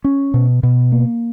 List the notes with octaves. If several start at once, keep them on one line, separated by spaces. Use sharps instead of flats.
C#4
B2
B2
A#3